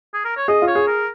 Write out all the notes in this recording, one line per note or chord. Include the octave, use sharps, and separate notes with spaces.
G#4
A#4
C#5
G#4 D#5
F4
C#5
G#4
A#4